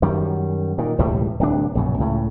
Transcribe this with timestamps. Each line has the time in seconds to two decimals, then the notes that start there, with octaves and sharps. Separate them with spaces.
0.02 F#2 D#3 G3
0.78 A#2 D#3
0.98 E1 C#2 A2 G3
1.40 D1 C2 D4
1.75 A#1 F#2 C#3
1.98 C#2 A2 C#3